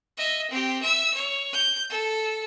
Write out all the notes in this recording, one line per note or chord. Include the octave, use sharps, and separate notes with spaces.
D#5 E5
C4 G4
E5 E6
C#5
G6
A4